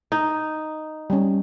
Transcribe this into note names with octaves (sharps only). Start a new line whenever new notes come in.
D#4
G3 C#4